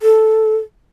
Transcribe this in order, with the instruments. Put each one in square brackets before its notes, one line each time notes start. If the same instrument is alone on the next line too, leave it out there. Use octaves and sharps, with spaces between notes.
[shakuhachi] A4